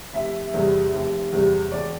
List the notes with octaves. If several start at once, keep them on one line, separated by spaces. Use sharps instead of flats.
F1 E5
E2 C3 G3
F1
E2 C3 G3
E1 D5